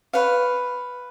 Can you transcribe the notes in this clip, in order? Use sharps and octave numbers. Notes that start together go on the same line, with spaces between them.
B4 C#5 F5